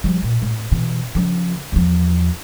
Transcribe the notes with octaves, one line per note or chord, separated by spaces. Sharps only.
F3 G3
A#2
A2
B2 E3
C#3 F3
E2 F3